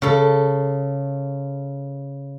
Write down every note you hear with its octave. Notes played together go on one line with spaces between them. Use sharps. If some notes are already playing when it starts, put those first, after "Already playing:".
C#3 A4